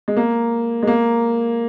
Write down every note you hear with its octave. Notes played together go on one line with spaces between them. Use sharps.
G#3
A#3
G#3
A#3